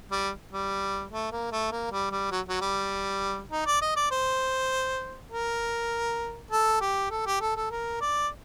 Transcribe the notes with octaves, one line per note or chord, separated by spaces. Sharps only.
G3
G3
A3
A#3
A3
A#3
G3
G3
F#3
F#3
G3
D#4
D5
D#5
D5
C5
A#4
A4
G4
A4
G4
A4
A4
A#4
D5